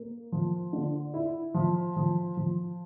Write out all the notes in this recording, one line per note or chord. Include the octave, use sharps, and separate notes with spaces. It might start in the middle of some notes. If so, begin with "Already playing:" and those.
Already playing: A#3
F3
D3
E4
F3
F3
F3